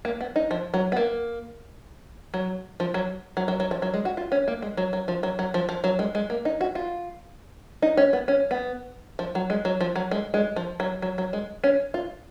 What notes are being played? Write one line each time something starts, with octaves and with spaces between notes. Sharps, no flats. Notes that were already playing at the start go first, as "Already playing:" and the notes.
A#3
B3
D#4
F3
F#3
B3
A#3
F#3
F3
F#3
F#3
F#3
F#3
F3
F#3
G#3
F#4
F4
C#4
A#3
G#3
F#3
F#3
F3
F#3
F#3
F3
F3
F#3
G#3
G#3
A#3
D#4
F#4
F4
D#4
C#4
B3
C#4
B3
F3
F#3
G#3
F#3
F3
F#3
G#3
G#3
F3
F#3
F#3
F#3
G#3
C#4
F4